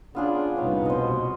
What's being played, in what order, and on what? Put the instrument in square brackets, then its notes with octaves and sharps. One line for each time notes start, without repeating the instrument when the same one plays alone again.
[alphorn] C#3 [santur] B3 F4 G#4 [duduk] D4
[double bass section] F1 C2 A#2 [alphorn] B3 [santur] C#4 F5 [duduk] D#4
[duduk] B2 [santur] C5 D#5